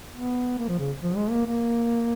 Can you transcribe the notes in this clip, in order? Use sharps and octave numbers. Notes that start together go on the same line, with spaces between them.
B3
A#3
F3
C#3
F3
G#3
A#3
A#3